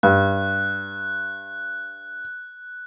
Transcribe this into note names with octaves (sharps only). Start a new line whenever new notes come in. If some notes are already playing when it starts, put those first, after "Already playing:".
G2 F#6